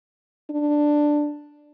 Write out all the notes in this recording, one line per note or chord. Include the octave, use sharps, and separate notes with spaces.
D4